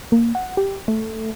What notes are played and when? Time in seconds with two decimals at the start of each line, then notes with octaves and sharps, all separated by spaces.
0.12 A#3
0.35 F#5
0.57 G4
0.88 A3